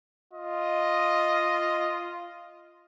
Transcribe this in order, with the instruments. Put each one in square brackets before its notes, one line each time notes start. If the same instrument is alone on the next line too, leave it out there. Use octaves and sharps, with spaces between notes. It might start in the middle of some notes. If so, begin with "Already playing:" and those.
[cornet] F4 [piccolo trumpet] D#5